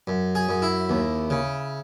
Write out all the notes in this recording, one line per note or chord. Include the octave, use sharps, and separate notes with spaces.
F#2
G#4
F#2
E4
D#2
C#3